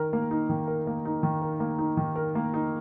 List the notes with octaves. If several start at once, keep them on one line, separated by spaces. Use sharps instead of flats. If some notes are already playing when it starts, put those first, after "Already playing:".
Already playing: D#3 A#4
A#3
D#4
D#3
A#4
A#3
D#4
D#3
A#4
A#3
D#4
D#3
A#4
A#3
D#4